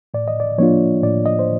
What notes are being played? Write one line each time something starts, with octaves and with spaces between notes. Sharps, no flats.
A2 D5
D#5
D5
F3 A#3 D4 F4 C#5
A2 D5
D#5
C5